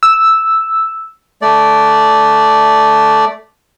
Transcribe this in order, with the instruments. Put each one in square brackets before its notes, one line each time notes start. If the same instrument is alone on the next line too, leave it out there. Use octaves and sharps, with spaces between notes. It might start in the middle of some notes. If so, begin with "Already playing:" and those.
[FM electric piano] E6
[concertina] A3 D5